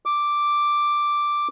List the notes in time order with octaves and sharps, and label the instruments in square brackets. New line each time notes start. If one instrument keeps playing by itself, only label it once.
[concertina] D6